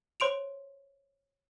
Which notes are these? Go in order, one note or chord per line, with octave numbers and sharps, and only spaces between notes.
C5 C#5 C6 D7 F7